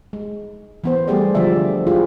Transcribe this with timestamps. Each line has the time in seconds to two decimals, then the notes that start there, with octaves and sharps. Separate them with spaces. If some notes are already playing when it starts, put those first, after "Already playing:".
0.13 G#3
0.84 E3 B3 C5
1.07 G3 A3 B3 G4 G#4 D5
1.35 D3 F3 G#3 D5 E5
1.87 G#3 E4 F4 G4 G#4